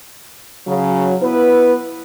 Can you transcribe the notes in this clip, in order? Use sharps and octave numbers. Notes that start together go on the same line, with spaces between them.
C#3 F#3
B3 E4 B4